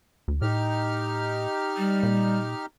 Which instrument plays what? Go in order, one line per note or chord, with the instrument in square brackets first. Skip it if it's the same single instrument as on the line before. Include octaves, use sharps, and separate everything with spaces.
[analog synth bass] D2
[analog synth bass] A2 [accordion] D#4 G4 F6
[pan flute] G3
[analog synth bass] A#2